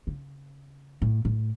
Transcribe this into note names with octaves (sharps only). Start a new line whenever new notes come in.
C#3
A2
A2